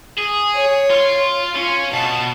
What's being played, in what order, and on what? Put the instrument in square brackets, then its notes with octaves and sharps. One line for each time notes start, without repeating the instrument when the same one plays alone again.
[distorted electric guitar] G#4
[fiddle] C#5
[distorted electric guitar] F4 C6
[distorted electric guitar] C#4 [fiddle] F4
[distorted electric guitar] B2 [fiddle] A5